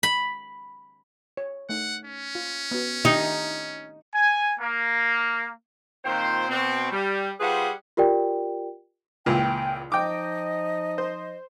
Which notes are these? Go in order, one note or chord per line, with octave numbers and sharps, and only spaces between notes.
B5
C#5
A3 D#4 F#5
C#4
F4
B3 F#4
D#3 D4 D#4 G4
G#5
A#3
A#2 D#3 C4 F4 C5
B2 C4
G3
G3 F4 G#4 B4 C5 F#5
F4 G4 A#4 D5 G5
C#2 A#2 E3 G5
F3 D#4 D#5 G5 D6
C5